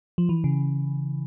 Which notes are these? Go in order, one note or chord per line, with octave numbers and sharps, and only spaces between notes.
F3
E3
C#3